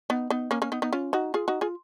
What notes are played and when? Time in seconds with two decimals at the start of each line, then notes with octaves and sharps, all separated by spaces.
0.10 B3 D#4
0.30 B3 D#4
0.51 A#3 C#4
0.62 A#3 C#4
0.72 B3 D#4
0.82 B3 D#4
0.92 C#4 F4
1.13 D#4 F#4
1.34 F4 G#4
1.48 D#4 F#4
1.61 F4 G#4